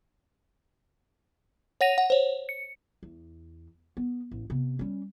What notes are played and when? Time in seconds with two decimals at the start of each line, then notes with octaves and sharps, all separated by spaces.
1.81 C#5 F#5 A#6 D#7 F7
1.98 F#5
2.10 C5 C#5
2.49 C#7
3.03 E2
3.97 B3
4.31 A1
4.50 C3 B3
4.79 G3 C#4